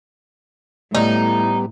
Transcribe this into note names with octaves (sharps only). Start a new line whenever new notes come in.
A2 G3 B3 D#4